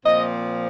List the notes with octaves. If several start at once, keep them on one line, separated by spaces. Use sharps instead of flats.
A#2 F3 C4 D#5